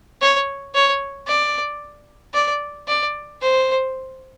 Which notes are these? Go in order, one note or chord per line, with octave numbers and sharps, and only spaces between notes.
C#5
C#5
D5
D5
D5
C5